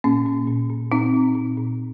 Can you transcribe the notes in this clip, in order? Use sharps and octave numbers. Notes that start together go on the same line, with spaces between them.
A#2 A#3 C#4
A#2
A#2
A#2
A#2 C4 D#4
A#2
A#2
A#2